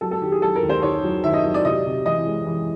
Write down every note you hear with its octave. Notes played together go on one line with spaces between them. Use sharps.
F#3 A4
A4
D#3 G4
G#4
F#3 A4
A#4
D#2
C5
D#3 C#5
F#3
D#3 E5
D#5
F#3
D5
C3 D#5
C3
E3 D#5
G#3
E3